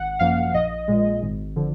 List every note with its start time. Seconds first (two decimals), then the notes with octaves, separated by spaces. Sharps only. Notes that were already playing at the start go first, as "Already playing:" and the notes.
Already playing: G#1 F#5
0.19 F#2 F3 A#3 F5
0.53 A#1 D#5
0.88 A#2 G#3
1.22 G#1
1.56 D3 F3